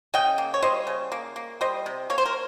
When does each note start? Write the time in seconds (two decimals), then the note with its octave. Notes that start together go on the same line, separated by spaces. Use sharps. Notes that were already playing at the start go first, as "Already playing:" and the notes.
0.14 C#3 D#5 G5
0.38 A#3
0.54 C#5
0.63 G3 C5 D#5
0.87 C#3
1.12 A#3
1.36 A#3
1.61 G3 C5 D#5
1.86 C3
2.10 A#3 C#5
2.18 C5
2.26 A#4